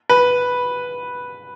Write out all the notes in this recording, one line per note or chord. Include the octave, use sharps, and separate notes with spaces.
B4